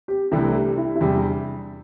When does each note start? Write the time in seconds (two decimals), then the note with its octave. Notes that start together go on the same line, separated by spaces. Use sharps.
0.08 G4
0.31 C2 C3 E3 A3 D4 E4
0.55 G4
0.78 E4
0.95 E4
1.01 E2 C3 G3 D4 G4